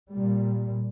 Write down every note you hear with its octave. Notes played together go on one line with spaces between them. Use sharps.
A#2 G3